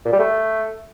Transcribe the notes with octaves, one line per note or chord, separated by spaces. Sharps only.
A#2
G3
A3